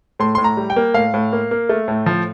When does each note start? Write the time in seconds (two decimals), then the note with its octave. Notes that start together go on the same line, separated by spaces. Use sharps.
0.19 A2 C6
0.35 A2 C6
0.44 A#5
0.57 G3
0.70 G5
0.76 A#3
0.94 A2 F5
1.14 A2
1.33 A#3
1.51 A#3
1.69 A3
1.88 A2
2.06 F3